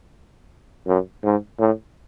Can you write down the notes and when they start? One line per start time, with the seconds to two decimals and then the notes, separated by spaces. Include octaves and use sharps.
0.87 F#2
1.24 G#2
1.59 A2